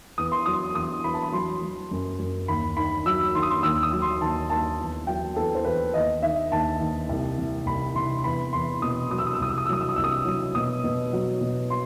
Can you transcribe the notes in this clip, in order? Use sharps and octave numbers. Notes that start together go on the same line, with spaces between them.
E2 D#6
C6
F#3 D#6
E2 D#6
E2 B5
A5
B5
F#3 C6
F#3
F#2
F#2
D#2 B5
D#3 B5
F#3 E6
D#3 C6
D#6
C6
D#2 E6
D#6
F#3
C6
D#2 A5
D#2 A5
E2
F#3 G5
E2 A4
C5
E2 B4
D#2 D#5
D#3 E5
D#2 A5
D#2
C2
C3
C2 B5
C3 C6
E2 B5
E2 C6
B2 D#6
F#3 D#6
E6
D#6
E6
C2 D#6
E6
D#6
E6
F#3 D#6
E6
D#6
C2 E6
D#6
F#3
B2 D#6
B2
F#3
B2
C6